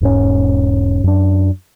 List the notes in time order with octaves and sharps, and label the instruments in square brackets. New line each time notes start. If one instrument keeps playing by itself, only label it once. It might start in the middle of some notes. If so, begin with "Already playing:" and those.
[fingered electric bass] E1 G#2 G3 C#4
F#2 D4